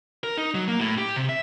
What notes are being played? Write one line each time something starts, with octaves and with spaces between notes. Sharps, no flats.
A#4
D#4
F#3
A#3
A2
G4
C3
E5